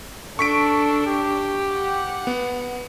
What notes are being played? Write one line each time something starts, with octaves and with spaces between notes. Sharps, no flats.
D4 A4 C#6 B6 D7
G4
F#5
B3